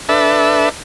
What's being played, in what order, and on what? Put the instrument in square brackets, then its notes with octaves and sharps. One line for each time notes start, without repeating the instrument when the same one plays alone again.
[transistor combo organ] D4 A4 B4 E5